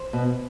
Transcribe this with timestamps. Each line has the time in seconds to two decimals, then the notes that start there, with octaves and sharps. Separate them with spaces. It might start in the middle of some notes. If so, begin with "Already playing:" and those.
Already playing: C5
0.13 B2